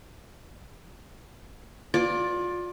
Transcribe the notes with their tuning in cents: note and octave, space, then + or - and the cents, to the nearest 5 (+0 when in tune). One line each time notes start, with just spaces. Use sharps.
F4 +25 D5 +0